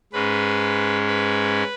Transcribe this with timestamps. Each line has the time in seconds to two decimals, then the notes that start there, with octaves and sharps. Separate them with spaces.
0.13 G#2 G#3 C#4 B4
1.07 B4